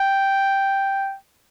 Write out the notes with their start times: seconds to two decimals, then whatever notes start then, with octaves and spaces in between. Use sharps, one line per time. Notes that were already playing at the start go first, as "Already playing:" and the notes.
Already playing: G5